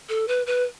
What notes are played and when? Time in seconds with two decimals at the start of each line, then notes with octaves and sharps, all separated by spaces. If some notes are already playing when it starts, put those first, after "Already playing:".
0.09 A4
0.28 B4
0.47 B4